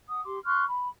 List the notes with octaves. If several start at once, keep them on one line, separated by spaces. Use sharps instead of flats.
F#5 D#6
G4 C6 D6
C6 C#6 F6 F#6
B5